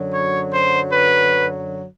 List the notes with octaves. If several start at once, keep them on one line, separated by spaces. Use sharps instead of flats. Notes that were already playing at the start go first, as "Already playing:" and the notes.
Already playing: F#2 D3 F#3
C#5
C5
B4